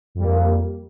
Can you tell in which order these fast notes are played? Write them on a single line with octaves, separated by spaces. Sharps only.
F2 G3 A#3